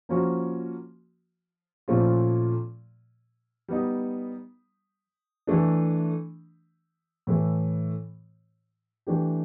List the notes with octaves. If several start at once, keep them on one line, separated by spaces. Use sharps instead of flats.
F3 A#3 C#4 F#4
A#2 F3 A3 C#4 F4
G3 B3 D#4
E3 A3 D4
A2 E3 A3
E3 A3 D4 G4